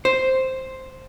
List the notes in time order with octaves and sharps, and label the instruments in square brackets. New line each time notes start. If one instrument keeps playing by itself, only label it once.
[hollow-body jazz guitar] C5